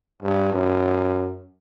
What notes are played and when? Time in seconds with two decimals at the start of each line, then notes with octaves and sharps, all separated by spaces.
0.22 G2
0.52 F#2